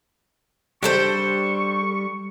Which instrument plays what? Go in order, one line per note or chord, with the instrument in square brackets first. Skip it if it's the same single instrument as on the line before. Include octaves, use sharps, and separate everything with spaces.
[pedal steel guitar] G3 G4 [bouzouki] D4 A4 C5 [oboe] C#6